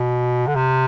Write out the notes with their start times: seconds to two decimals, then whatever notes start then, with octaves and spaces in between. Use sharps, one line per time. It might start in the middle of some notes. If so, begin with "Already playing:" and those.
Already playing: B2
0.47 D3
0.56 C3